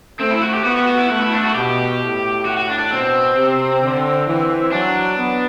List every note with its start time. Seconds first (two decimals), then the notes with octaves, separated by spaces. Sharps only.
0.19 A3 C4
0.31 E4
0.42 F#4
0.53 G4
0.64 B3 F#4
0.76 F#4
0.87 F#4
0.99 E4
1.10 A3 F#4
1.21 E4
1.33 D4
1.43 F#4
1.55 B2 G4
2.01 A2
2.45 F#4
2.57 F#4
2.69 D4
2.79 D4
2.90 B2 C4
3.35 C3
3.82 D3
4.27 E3
4.72 F#3 D4
5.17 B3